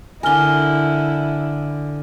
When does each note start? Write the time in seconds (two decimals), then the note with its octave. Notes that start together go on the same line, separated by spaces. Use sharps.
0.23 D3 E4 A#4 G#5 F6 G7